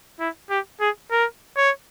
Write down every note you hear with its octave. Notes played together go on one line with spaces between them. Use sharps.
E4
G4
G#4
A#4
C#5